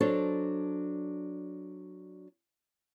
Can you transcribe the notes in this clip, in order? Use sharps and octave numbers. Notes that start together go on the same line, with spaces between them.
F#3 D4 A4 C5 C#5